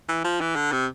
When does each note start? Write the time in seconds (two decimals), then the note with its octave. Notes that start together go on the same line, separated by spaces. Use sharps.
0.09 E3
0.25 F3
0.41 E3
0.56 D3
0.72 C3